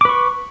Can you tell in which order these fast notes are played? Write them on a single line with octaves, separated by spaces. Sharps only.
D6 B4 C#6